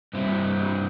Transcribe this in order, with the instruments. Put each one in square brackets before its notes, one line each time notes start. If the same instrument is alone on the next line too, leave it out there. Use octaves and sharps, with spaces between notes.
[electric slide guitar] G2 C3 C4 E4